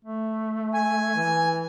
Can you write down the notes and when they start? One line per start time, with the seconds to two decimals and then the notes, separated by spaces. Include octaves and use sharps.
0.05 A3
0.74 G#5
1.16 E3